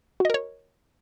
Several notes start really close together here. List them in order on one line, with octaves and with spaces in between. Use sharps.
F#4 D#5 A#4 C#5